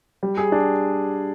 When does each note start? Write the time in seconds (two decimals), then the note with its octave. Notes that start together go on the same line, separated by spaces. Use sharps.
0.23 G3
0.38 G#4
0.52 D4